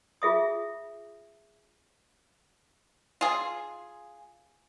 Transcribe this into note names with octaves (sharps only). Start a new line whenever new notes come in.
F4 G#4 E5 D#6
F4 G#4